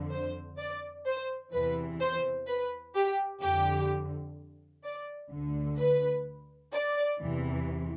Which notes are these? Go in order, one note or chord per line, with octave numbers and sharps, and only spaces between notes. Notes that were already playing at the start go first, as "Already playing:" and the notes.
Already playing: F2 D3
C5
D5
C5
E2 C3 E3 B4
C5
B4
G4
F2 D3 G4
D5
D2 D3
B4
D5
E2 C3 E3